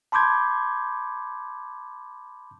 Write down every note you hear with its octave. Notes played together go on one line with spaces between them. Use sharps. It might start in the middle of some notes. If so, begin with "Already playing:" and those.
A5 B5 C6 D6 G6 G#6